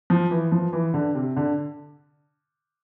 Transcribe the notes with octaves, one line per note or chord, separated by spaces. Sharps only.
F3
E3
F3
E3
D3
C3
D3